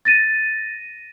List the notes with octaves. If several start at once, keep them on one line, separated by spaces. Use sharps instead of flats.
A6 A#6 D#7